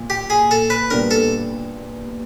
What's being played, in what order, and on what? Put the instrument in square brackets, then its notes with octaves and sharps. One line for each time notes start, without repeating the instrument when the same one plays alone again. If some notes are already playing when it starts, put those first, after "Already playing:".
Already playing: [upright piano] A#2
[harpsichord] G4
G#4
A4
B4
[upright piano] A#2 G3 B3 D4 [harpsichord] A#4
[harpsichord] A4